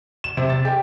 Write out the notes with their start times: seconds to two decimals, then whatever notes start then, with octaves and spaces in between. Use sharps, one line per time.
0.24 E7
0.37 C3
0.50 A6
0.65 G4